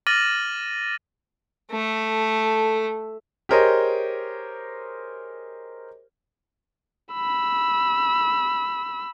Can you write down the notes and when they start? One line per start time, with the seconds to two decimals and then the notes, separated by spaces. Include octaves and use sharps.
0.07 D6 F6 A6 A#6 D#7 F#7
1.72 A3 A4
3.49 G4 G#4 A#4 C5 C#5 D#5
7.14 B5 E6